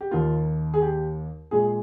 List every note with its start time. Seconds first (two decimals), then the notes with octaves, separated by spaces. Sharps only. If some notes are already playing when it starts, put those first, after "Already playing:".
0.01 G4
0.11 D#2 D#3 A#3 F4
0.74 G#4
0.82 G4
1.51 A#2 G#3 G#4